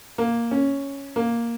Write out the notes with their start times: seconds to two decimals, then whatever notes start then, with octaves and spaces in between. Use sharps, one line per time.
0.18 A#3
0.51 C#4
1.16 A#3